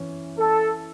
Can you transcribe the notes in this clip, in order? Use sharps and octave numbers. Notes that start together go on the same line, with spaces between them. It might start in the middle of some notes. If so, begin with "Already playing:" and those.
Already playing: E3 C#4
A4